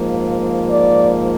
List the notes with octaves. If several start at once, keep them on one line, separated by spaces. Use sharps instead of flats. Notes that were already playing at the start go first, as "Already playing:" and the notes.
Already playing: G#2 F3 A#3
D5